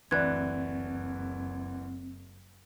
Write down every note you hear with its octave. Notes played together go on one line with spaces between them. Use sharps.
F#1 D2 E3 C4 D5 F#6 G#6